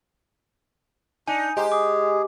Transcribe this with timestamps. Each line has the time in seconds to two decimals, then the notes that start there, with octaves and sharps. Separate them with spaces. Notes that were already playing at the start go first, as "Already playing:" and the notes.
1.28 D4 D#4 G#5
1.57 G#3 D#4 G4 C5
1.72 G#4 D6